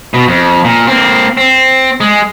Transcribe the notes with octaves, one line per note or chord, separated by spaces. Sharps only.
B2
F2
A#2
A#3 C4
C4
G#3